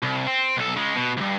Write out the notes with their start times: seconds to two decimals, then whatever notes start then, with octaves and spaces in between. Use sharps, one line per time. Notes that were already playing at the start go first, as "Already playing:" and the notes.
0.02 C2
0.27 C4
0.57 B1 A4
0.76 C#3 G#3
0.95 B2
1.17 D2 G2